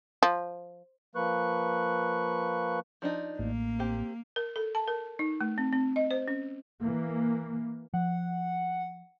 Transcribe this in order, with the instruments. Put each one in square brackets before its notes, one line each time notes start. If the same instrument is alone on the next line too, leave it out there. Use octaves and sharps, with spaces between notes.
[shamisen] F3
[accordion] F3 A#3 B4 C#6 F#6
[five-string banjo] F3 D4 D#4
[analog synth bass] A1 [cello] A#3
[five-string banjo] C4 G4
[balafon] A#4
A4
A5
A#4
D#4
A3
C4
C4
D#5
C5
C#4
[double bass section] E3 A#3
[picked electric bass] F3 [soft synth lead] F#5